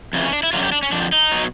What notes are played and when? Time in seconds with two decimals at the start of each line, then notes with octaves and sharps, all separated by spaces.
0.13 F2 C#3 E3
0.24 C#4
0.33 D4
0.43 E4
0.53 F#2 D3 F#3 F4
0.63 G4
0.72 D4
0.83 C#4
0.92 F2 D3 F3 D4
1.12 D#4
1.31 B2 F#3